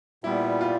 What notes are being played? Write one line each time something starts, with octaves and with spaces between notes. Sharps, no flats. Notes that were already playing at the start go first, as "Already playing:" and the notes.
A#2 G3 B3 E4
F4